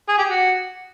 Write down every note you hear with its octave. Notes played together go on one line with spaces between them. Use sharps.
G#4
G4
F#4